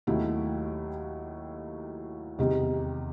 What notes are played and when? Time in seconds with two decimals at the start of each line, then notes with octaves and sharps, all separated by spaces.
0.07 D#2 D#3 F#3 A3 E4
2.39 E2 C3 D#3 G3 D#4